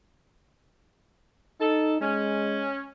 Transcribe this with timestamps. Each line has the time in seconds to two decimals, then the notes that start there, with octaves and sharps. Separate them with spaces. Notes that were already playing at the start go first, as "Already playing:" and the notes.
1.61 D#4 A4
2.01 G#3 C#4